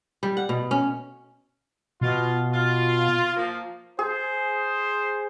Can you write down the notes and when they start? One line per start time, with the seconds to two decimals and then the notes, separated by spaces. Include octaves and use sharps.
0.23 G3
0.37 F#5
0.49 B2
0.71 C#4
2.01 B2 F4
2.53 F4
3.35 F3 A#3
3.99 G#4 C5